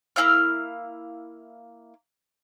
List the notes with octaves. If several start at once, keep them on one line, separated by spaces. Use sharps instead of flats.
A#3 E4 F5 F6